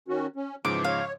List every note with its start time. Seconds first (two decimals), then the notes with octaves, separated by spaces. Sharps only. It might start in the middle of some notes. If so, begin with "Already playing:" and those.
0.08 D#3 C#4 F#4
0.36 C#4
0.65 G#2 C#3 E3 F3 D6
0.84 C#5 F5